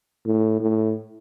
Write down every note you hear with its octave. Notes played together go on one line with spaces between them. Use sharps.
A2
A2